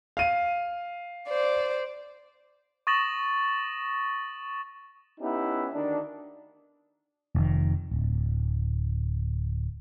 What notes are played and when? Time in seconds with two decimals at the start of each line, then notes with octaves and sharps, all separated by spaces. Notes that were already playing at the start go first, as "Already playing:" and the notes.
0.17 F5 D#7
1.28 C5 D5
2.87 C#6 D#6 A6 A#6 E7 F#7
5.20 B3 C#4 D#4 E4 G4
5.73 D2 D#3 D4
7.35 F1 D#3
7.91 D1